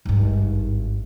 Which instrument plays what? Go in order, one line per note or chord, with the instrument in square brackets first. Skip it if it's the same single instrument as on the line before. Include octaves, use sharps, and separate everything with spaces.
[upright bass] G#1 G2